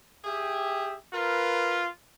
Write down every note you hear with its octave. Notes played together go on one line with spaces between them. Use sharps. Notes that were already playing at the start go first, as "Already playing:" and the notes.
G4 G#4 E5
F4 A#4 B4